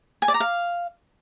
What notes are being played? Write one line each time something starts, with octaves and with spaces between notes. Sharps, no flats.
G#5
D5
A#5
F5